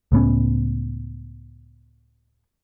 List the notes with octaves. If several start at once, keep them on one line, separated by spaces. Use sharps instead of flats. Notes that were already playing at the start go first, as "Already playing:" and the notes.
C#2 A2 B3 C#4